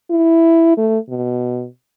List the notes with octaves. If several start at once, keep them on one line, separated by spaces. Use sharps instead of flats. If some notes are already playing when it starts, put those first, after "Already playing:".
E4
A3
B2